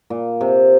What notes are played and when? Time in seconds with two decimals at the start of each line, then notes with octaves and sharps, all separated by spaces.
0.10 A#2
0.41 C3